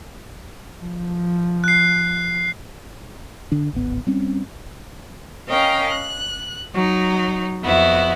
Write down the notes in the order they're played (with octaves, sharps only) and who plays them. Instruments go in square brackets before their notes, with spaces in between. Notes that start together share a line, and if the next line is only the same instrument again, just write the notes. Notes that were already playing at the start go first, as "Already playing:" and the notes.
[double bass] F3
[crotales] F#6 C7
[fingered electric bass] D3 D4
D1 G#1 B3
G3 C4 C#4
[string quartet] C#4 A#4 D#5 F5 G5
F#6
F#3 D#4
F2 B3 E4 F#4